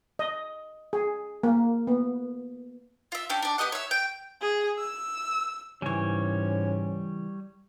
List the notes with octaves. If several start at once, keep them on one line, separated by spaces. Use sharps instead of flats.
D#5
G#4
A#3
B3
F4 E5
C#4 D4 G4
D4 D5
B3 G4 D#5 F#5
C#5 E5
G5
G#4
E6
G#2 C#3 E3 G3 C#4 C#5